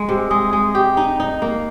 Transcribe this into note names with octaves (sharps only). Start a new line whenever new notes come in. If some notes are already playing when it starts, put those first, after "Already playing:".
Already playing: G#3
C3
G#3 D#6
G#3
G4
D#4
D#4
A#3